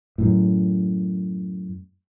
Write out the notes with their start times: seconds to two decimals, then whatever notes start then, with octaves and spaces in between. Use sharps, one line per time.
0.18 F#2 A2